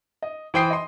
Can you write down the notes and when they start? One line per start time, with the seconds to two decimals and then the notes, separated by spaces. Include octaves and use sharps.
0.22 D#5
0.54 E3 C5 G5 D#6 C7
0.70 D#5 C6